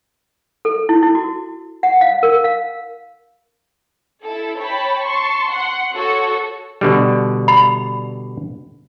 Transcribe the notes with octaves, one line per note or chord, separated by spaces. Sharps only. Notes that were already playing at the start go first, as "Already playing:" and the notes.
A4
E4
E4
F#4
F#5
F5
A#4
F5
E4 A4
C#5 G5 A5 B5
A5 C6 C#6
F#5 C6
F#4 A4 C#5
B2 D3 G3
B5